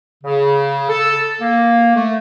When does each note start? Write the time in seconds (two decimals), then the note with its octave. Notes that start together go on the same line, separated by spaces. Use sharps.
0.24 C#3
0.89 A4
1.41 A#3
1.96 A3